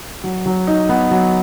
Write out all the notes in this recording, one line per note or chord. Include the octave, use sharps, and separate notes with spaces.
F#3
F#3
D#4
B3
F#3